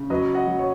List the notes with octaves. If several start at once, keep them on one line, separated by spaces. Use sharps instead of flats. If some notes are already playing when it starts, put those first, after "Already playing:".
Already playing: C#3
F#3 B4 D#5
D#5 F#5
F#3
C#5